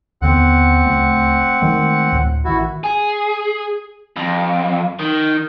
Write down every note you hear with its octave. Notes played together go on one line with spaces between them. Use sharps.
D#2 D3 B3 C4 F#5
D1 C#2 A3
D#3 G#3 A3
D2 A2
A1 D#3 E4 F#4
G#4
F2
D#3